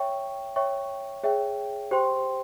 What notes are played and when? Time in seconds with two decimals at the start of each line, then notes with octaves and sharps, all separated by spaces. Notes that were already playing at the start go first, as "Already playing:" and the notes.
Already playing: C#5 E5 G5 C#6
0.56 C#5 E5 G5 C#6
1.23 G#4 C#5 E5 G5
1.91 G4 C5 G5 C6